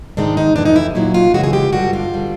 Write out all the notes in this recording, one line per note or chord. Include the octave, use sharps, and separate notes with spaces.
G#2 D#3 G#3 D4
D#4
F2 C3 E3 D4
D#4
E4
A#2 F#3 E4
F4
F#2 C#3 E3 G#3 F#4
G#4
G4
G2 D3 G3 F#4
F4
D3 G3